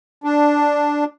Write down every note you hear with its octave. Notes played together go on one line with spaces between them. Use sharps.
D4